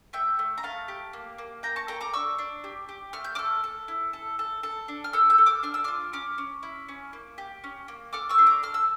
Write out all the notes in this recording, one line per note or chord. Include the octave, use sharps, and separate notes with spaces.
A3 E5 G5
A3
A#5
A3 F5 A5
G4
A#3
A#3
A#3 G5 A#5
A5 C#6
A4 G5 A#5
A#5 D6
D4 C#6 E6
D4
G4
G4
A3 F6
G6
A4 D6 F6
A4
E4
A4
A4
A4
D4
F6
A4 E6 G6
E6 G6
A4
D6 F6
D4 F6
E6
F4 D6 F6
C#4 D6 F6
C#4
E4
C#4
A#3
G4
C#4
A#3
A4 D6 F6
C#6 E6
D4
A#5 D6
A4 F6
E6